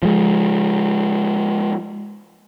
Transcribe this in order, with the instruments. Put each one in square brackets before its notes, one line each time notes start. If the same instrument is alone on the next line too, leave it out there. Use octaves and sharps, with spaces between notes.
[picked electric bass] F3 G#3